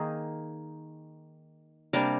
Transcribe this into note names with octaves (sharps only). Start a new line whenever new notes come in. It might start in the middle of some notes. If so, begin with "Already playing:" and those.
Already playing: D#3 A#3 D#4 G#4
C3 G3 A#3 D4 A#4